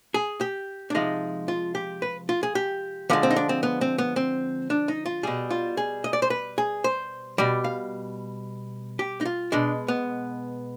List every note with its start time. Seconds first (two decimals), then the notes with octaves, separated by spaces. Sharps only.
0.14 G#4
0.41 G4
0.90 D4
0.95 C3 F3 G#3 D#4
1.48 F4
1.75 G4
2.02 B4
2.29 F4
2.43 G#4
2.55 G4
3.09 D3 F3 G#3 B3
3.23 C4
3.31 D#4
3.36 D4
3.49 C4
3.63 B3
3.81 C4
3.98 B3
4.16 C4
4.70 D4
4.88 D#4
5.06 F4
5.23 B2 G3 G#4
5.51 F4
5.77 G#4
6.04 D#5
6.13 D5
6.22 C5
6.30 B4
6.58 G#4
6.84 C5
7.38 B2 G3 D5
7.64 F5
8.99 G4
9.21 D#4
9.25 F4
9.52 B2 G#3 D4
9.88 B3